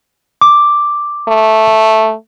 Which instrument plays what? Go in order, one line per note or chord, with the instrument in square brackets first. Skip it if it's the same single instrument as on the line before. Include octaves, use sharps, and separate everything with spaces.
[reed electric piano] D6
[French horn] A3